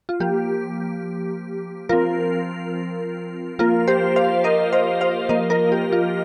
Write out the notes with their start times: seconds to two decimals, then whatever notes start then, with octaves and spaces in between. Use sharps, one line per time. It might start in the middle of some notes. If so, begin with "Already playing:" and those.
0.09 F4
0.20 F3 A#3 G4
1.89 F3 C4 F4 A#4
3.59 F3 A#3 F4 A#4
3.87 G4 C5
4.16 C5 F5
4.44 A#4 D#5
4.72 C5 F5
5.01 C5 F5
5.29 F3 A#3 A#4 D#5
5.50 F4 A#4
5.72 G4
5.92 F4